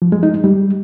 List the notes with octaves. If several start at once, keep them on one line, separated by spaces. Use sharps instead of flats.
F3
G#3
D#4
G#3
G3